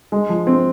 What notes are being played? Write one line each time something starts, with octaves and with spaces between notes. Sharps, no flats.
G#3
F3
C4